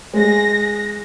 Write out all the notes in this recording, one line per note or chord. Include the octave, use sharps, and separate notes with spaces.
G#3 G#4 A#6